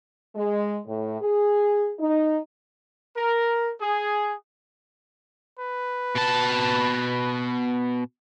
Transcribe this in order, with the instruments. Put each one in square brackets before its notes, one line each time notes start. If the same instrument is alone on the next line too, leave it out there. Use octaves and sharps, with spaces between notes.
[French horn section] G#3
A2
G#4
D#4
[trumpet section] A#4
G#4
[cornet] B4
[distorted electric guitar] B2 A5